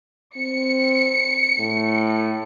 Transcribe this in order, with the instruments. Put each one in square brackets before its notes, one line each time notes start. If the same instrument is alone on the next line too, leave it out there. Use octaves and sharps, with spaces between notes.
[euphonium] C4 [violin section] C#7
[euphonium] A2